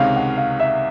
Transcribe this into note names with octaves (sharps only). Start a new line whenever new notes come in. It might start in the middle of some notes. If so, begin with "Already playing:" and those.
Already playing: C#2 C3 D#3 G#3 C#4 F5
F#5
F5
E5